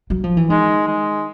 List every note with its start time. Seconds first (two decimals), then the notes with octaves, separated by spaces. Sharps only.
0.10 F#3
0.24 F3
0.37 E3
0.50 D#3 G#3
0.87 G#3